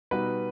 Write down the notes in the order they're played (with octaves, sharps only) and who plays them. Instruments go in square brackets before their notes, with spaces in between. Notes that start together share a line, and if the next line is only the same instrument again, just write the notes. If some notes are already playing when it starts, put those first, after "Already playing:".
[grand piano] B2 G3 D#4 F#4 [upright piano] B4